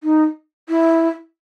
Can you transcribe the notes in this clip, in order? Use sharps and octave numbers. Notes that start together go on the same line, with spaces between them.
D#4
E4